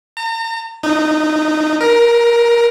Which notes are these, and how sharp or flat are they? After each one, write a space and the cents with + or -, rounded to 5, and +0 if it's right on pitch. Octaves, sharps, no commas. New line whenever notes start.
A#5 -40
D#4 -20
A#4 +15